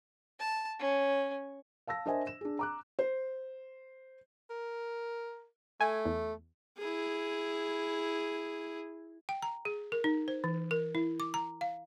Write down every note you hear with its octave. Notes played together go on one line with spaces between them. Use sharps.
A5
C#4
F5 A5 E6 A#6
D4 A#4 C5 D#5 E5 G#5
E7
D4 G#4
A#5 D6 F#6
C5
A#4
A3 G#5
E2
E4 G#4
G5
A#5
G#4
A#4
D#4
C5
E3
A#4
E4
D6
A#5
F5